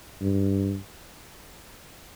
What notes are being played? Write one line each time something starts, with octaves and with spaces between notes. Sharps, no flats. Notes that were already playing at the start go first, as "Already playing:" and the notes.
G2